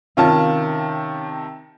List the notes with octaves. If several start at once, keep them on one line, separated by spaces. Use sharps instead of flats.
C3 D#3 C#4 F4 F5 A5